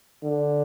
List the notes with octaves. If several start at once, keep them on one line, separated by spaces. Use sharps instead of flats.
D3